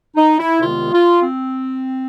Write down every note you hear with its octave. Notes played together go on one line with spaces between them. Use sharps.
D#4
E4
C2 C3 D#3 G#3 B3 F4
F4
C4